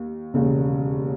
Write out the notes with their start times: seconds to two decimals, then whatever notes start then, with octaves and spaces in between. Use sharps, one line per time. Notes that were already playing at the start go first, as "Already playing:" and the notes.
Already playing: D#2
0.34 E1 D#2 C#3